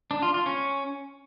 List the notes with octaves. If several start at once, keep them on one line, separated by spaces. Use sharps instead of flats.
D4
F4
F4
C#4